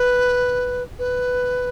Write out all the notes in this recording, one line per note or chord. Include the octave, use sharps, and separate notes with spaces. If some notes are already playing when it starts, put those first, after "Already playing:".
Already playing: B4
B4